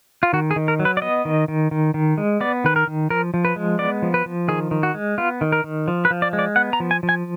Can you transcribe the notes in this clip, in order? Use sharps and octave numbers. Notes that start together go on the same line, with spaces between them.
F4
D#3 F#4
G#4
D#3
A#4
F#3
B4
D5
B3 D#5
D#3
D#3
D#3
D#3
G#3
B3 D5
D#3 B4
A#4
D#3
F3 A#4
F3
B4
G#3
B3 D5
F3
B4
F3
D#3 G#4
D#3
F#4
G#3
B3 F4
D#3
A#4
D#3
F3
B4
F3
D5
G#3
D5
B3 F#5
A#5
F3
G#5
F3
G#5